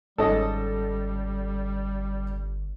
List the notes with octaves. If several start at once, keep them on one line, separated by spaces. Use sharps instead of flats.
G1 G#2 G3 C#4 A4 D#5